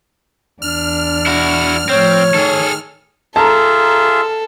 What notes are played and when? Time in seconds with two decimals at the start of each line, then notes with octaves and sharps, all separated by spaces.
0.62 E2 D4 F6
1.27 E4 F#4
1.89 A2 F3 C4 C#5
2.35 D#3 G#4 A4
3.36 F4 G#4 A4 E5 A5 A#5